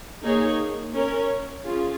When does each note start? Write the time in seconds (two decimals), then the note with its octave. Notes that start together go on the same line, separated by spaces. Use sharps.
0.22 A#3 D#4 G#4 C#5
0.93 C#4 A#4 C#5
1.65 C#4 F4 G#4